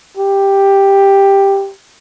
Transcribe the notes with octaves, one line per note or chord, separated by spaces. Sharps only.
G4